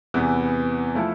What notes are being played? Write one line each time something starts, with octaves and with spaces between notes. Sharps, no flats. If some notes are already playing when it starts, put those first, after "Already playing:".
E2 C3 E3 B3
F3 A3 E4 A4